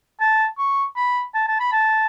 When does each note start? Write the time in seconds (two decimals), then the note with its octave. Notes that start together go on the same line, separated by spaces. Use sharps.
0.20 A5
0.58 C#6
0.96 B5
1.34 A5
1.47 A5
1.60 B5
1.72 A5